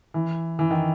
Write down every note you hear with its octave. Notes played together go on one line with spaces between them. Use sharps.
E3
E3
D#3